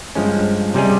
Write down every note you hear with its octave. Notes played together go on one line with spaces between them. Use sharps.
G2 F3 G#3 C#4
C3 G3 C#4 G#4 D#5